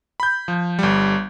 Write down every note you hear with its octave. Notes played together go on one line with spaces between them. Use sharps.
B5 G6
F3
G1 G3